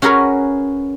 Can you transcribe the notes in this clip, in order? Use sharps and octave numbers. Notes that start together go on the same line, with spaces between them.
C#4 F#4 G#4 A#4 B4 C#5